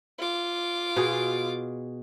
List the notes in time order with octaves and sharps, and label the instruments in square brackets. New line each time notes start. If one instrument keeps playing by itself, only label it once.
[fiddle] F4 D6
[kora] B2 G#4